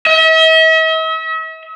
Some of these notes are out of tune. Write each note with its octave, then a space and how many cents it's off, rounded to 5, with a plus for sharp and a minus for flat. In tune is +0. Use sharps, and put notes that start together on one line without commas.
E5 -45